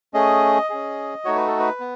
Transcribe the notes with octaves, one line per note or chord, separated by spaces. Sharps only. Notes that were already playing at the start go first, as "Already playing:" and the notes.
A3 C#4 G#4 D#5
C#4 G#4
A3 D#4 F#4 C#5
B4
A4
B4
B3